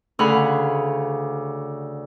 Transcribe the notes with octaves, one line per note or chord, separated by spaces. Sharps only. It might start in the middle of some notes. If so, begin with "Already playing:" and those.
D2 C#3 F5 F#5 G#5 B5